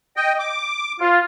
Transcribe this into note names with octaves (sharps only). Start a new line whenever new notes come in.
D#5 G5
D6
F4